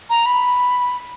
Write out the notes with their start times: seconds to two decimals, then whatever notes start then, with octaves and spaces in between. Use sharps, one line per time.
0.10 A#5
0.26 B5